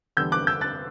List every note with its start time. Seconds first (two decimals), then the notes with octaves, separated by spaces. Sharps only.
0.17 E2 D3 G3 E6 G6
0.32 D6 F#6
0.47 E6 G6
0.61 F#6 A6